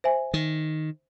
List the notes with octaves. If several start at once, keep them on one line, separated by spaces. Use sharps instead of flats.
C5 E5 G#5
D#3